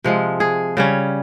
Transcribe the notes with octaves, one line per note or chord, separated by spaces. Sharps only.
C3 F3 G#3
G#4
C#3 G3 C#4